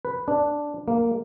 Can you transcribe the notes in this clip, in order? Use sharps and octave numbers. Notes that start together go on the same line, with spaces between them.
B4
D4
A#3